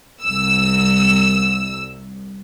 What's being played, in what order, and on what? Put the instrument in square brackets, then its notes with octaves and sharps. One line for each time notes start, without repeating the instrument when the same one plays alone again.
[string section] C2 E6